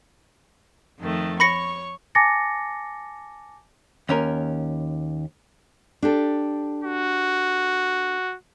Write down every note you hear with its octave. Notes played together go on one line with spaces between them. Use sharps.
F2 D#3 A3
C#5 B5 C#6 A#6 C#7
G#5 A5 D6 A6 A#6 C#7
D#2 C#4 A#4
D4 G4 A4
F#4